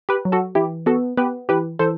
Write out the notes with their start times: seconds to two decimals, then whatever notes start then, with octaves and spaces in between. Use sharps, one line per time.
0.09 G4 B4
0.25 F#3
0.32 F#4 A4
0.55 E3 E4 G4
0.86 B3 F#4 A4
1.17 B3 G4 B4
1.49 E3 G4 B4
1.79 E3 A4 C5